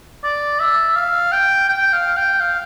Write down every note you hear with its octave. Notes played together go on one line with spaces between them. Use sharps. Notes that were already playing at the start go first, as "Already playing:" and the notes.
D5
E5
F5
G5
G5
F5
G5
F5